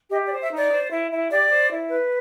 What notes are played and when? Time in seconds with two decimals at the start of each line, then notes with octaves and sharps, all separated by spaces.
0.11 G4 D#5
0.26 D5
0.31 C5
0.41 E5
0.51 D#4
0.57 D5
0.71 C5
0.91 E4
1.10 E4
1.30 G4 D5
1.50 C5
1.70 E4
1.89 B4